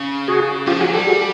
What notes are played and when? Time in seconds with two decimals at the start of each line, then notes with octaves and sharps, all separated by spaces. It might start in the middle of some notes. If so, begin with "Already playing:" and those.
Already playing: C#3
0.28 F#4 G#4
0.67 F3 F4 G4
0.80 F#3 F#4 G#4
0.94 G3 G4 A4
1.07 F#4 G#4